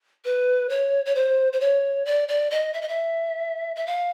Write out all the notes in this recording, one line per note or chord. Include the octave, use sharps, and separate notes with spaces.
B4
C#5
C#5
C5
C5
C#5
D5
D5
D#5
E5
D#5
E5
E5
F5